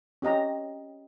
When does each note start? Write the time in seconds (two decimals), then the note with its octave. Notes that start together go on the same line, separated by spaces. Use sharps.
0.22 C#4 G4 D#5 A#5